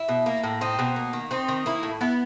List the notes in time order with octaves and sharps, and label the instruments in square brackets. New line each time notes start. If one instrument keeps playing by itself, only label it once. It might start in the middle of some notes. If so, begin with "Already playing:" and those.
Already playing: [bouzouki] E4
B2
A#3
A2
C4 D#4
B2
A#3
D#3
C4 D#4
D#3
A#3 E4
A2
B3 E4